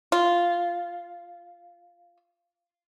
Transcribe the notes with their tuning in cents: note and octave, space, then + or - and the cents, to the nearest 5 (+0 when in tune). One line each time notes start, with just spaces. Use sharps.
F4 -5